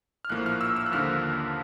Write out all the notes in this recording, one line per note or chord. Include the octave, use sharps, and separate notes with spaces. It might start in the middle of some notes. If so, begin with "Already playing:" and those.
F6
A#1 A2 F3 A#3 F#6
F6
E6
E6
F#6
D#2 D3 F3 A#3 F6